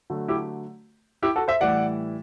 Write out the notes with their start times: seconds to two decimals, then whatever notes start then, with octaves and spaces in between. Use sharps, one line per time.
0.10 D3 F#3 A3
0.28 E4 G4
1.23 E4 G4
1.36 F#4 A4
1.48 C5 E5
1.61 A2 E3 G3 D5 F#5